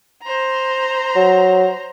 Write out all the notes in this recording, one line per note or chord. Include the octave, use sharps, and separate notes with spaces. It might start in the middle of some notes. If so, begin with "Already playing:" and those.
C5 A#5
F#3